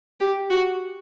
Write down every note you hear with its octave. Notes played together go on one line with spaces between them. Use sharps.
G4
F#4